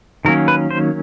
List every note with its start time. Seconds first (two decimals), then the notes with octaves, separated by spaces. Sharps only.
0.25 D#3 F#3 A#3 C#4 A#4
0.48 B4
0.71 C5